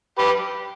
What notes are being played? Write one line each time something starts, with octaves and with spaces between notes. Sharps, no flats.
G4 B4